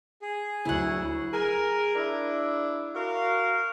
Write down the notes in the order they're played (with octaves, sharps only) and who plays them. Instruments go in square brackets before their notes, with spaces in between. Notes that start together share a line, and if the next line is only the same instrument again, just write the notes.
[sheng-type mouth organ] G#4
[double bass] D2 F#3 [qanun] E4 F#5
[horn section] G#4 A#4
D4 E4
F#4 A#4 F5